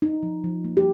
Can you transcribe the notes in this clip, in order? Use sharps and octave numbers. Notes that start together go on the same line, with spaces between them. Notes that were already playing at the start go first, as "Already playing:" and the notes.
D#4
F3
F3
A#3
G4